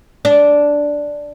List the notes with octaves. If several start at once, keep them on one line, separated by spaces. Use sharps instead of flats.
D4